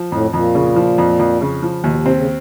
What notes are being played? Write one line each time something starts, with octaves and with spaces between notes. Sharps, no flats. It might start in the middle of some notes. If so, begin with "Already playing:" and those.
Already playing: F3
F2 A2
F2 A#2
C#3
F3
F2
F2
C#3
F3
D#2 B2
C3
C4
C#3